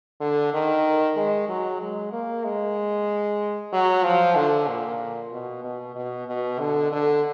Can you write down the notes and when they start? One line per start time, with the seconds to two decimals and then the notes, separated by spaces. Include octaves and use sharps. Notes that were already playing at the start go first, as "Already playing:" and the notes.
0.21 D3
0.53 D#3
1.17 G#3
1.49 F#3
1.81 G#3
2.13 A#3
2.44 G#3
3.73 F#3
4.04 F3
4.36 D3
4.68 A#2
5.32 B2
5.64 B2
5.95 B2
6.28 B2
6.59 D3
6.92 D3